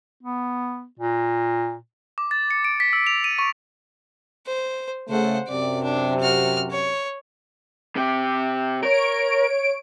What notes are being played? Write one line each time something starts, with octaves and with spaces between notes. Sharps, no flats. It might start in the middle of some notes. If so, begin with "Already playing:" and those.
B3
A#2
D6
A6
C#7
D7
B6
E6
F7
D#7
C#6
C5
C#3 A3 C5 F#5
F#2 C3 D5
D4
F#4 F6
C#5
C3 G4
A#4 C#5 D7